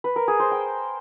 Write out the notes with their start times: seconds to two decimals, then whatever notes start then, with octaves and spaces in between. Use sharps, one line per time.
0.04 B4
0.16 A#4
0.28 G#4
0.40 C5
0.51 G5